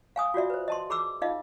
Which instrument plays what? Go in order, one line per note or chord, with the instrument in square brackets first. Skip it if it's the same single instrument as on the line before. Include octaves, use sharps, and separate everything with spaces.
[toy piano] F5 G#5 D#6
F4 F#4 D5 E5
B4 C5
D#5 A5 C6
G#4 B5 D6 E6
D#4 F4 D#5 F5